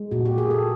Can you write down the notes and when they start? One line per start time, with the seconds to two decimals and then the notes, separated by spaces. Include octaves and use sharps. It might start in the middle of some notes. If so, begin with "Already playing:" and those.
Already playing: G#3
0.11 A#2 F#4
0.25 G4
0.37 A#3 G#4
0.50 A4